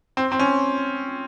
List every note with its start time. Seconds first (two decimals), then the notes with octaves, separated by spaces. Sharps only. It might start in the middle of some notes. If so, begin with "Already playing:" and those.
0.17 C4
0.32 C4
0.39 C#4